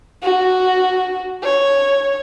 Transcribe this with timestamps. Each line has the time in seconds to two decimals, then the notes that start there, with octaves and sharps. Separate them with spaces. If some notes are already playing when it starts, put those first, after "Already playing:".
0.23 F#4
1.43 C#5